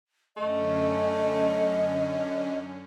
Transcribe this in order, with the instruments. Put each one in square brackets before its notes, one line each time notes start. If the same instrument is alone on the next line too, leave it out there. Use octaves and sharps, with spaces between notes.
[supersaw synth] F#2 D3 C#4 [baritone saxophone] A3 [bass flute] D#5